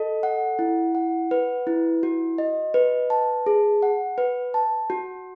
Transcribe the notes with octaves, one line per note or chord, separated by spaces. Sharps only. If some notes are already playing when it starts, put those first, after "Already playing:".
Already playing: A4 D#5
F#5
E4
F#5
B4
E4
F#4
D#5
B4
A5
G#4
F#5
B4
A5
F#4